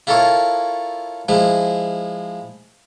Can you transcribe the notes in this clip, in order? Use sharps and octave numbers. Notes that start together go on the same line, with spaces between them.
E4 F4 A4 A#4 C#5
F3 G#3 E4